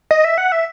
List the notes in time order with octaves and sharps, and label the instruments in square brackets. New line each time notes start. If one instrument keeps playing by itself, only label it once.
[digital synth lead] D#5
E5
F#5
E5